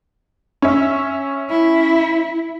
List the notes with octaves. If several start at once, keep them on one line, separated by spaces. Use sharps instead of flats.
C#4 E5
E4